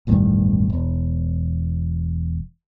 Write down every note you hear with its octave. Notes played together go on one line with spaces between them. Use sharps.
E1 A1 G2 D#3
E1